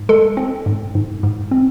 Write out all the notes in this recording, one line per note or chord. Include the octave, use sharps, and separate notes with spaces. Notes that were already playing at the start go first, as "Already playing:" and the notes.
Already playing: G#2
G#3 A4
C4
G#2
G#2
G#2
C4